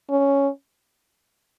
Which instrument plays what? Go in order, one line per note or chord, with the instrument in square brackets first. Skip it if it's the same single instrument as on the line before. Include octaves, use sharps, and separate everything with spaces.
[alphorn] C#4